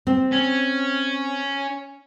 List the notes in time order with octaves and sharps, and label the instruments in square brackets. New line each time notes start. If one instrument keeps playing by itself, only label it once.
[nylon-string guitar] C4
[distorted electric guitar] C#4